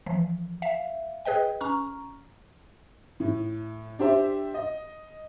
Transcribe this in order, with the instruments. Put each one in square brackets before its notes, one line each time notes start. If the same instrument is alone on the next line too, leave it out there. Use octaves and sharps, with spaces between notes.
[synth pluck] E3 F3
E5 F5
G#4 B4 D#5 G5
C#4 A#5 C#6 F6
[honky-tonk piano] A2
D4 G4 C5 E5
D#5